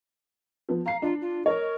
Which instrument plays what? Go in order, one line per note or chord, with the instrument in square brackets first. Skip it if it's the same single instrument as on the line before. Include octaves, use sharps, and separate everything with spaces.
[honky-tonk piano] F3 B3
[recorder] F5 [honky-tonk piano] A#5 C7
[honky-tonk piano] D4 [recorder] F4
[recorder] F4
[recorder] A#4 [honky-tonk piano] C#5 D#5